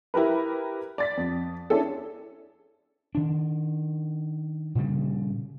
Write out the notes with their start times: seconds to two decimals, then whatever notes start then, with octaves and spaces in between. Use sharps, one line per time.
0.14 E4 G4 A#4 B4
0.98 D5 A6 B6
1.17 F2
1.70 C#4 D4 E4 G#4 A4
3.15 D#3 D4
4.75 A#2 C#3 G3